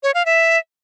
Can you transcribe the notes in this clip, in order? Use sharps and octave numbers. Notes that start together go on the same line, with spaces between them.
C#5
F5
E5